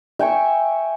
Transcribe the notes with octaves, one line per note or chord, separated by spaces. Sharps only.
E5 G5 G#5 C#6